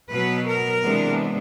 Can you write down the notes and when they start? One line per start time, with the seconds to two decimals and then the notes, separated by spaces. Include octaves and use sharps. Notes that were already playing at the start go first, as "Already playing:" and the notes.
0.11 B2 F#3 B3 B4
0.47 A#4
0.81 C3 E3 G#3 B3 D4